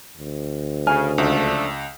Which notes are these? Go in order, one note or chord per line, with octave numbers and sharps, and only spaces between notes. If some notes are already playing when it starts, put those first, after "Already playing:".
D2
C#3 G#5 F6
C#2 F3 A3 D4